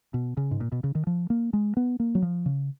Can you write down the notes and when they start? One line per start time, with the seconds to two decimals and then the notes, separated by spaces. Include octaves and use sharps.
0.14 B2
0.37 C#3
0.51 G#2
0.61 A#2
0.72 B2
0.84 C#3
0.95 D#3
1.07 F3
1.30 A#3
1.53 G#3
1.77 B3
2.00 A#3
2.15 F#3
2.22 F3
2.46 C#3